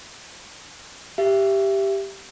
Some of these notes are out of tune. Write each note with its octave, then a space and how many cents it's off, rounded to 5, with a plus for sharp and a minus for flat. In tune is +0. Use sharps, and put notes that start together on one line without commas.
G4 +0 E5 +25